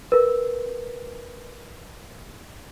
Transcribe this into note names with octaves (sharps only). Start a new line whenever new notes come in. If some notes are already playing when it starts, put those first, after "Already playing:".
A#4 B4